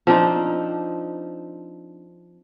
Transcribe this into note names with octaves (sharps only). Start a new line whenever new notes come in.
F3 C4 D4 D#4